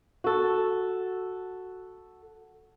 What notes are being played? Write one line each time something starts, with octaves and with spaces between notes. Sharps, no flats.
F#4 A4